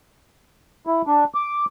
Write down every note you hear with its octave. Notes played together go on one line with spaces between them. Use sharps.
E4
D4
D6